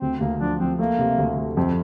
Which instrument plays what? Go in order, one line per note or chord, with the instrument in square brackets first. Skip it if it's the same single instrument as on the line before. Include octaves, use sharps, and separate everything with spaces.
[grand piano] D2 [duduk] C4
[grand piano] D2 [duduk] A#3
[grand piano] F3 [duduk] D4
[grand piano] F3 [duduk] C4
[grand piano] A3 [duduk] A#3
[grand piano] C3
D2
A3
[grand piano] F2 [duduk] C4